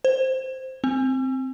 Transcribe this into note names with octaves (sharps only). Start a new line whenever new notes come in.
C5
C4